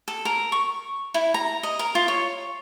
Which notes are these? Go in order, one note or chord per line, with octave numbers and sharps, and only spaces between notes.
A4
A#4
C#6
E4
A#5
D#5
A#4
F4
C#5